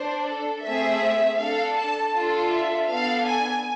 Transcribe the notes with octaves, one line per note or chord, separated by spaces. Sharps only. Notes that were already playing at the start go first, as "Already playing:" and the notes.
Already playing: D4 C5
A4
A3 C4 G#4 E5
D4 A4 F5
A5
D4 F4 A4
E5
B3 D4 A4 F5
G#5